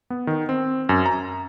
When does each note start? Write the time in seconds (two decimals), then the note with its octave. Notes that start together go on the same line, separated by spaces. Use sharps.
0.10 B3
0.27 D#3
0.49 C4
0.89 F#2
1.06 A#5